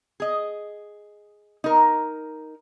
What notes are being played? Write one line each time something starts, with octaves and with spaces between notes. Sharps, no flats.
G#4 D#5
D#4 A#4